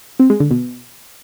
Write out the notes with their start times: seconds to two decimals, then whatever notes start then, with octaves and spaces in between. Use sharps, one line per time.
0.19 C4
0.30 G#3
0.40 D3
0.51 B2